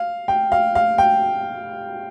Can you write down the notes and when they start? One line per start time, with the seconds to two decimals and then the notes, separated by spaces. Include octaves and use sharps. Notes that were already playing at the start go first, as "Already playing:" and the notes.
Already playing: F5
0.28 G5
0.52 F5
0.75 F5
0.98 G5